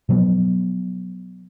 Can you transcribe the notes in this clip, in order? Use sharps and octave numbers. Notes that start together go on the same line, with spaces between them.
B2 F3 F#3 B3